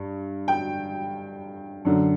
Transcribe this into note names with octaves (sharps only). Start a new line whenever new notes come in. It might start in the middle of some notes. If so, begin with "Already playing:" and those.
Already playing: G2
G5
F#2 D3